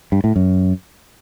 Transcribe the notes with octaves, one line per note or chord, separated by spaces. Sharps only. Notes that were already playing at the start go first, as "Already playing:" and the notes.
G2
A2
F#2